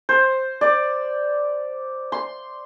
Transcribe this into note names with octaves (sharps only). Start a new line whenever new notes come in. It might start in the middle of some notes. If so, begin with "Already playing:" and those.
C5
D5
C6